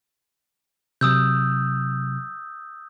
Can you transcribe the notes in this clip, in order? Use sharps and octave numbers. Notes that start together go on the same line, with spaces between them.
C3 F#3 D#6 E6 G6